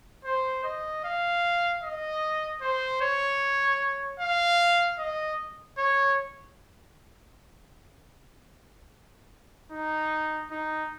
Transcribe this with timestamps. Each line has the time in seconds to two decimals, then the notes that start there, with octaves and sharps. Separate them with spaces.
0.25 C5
0.64 D#5
1.04 F5
1.83 D#5
2.61 C5
3.01 C#5
4.20 F5
4.99 D#5
5.78 C#5
9.72 D#4
10.51 D#4